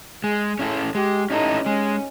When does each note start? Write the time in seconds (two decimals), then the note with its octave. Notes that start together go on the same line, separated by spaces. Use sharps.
0.24 G#3 G#4
0.59 C#4 E4 A4
0.95 G#3 G4
1.30 C#4 D#4 E4 A4
1.66 G#3 C#4